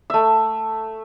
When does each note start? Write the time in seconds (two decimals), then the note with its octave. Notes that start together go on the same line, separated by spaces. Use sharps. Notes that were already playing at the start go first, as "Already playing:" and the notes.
0.10 A3 E5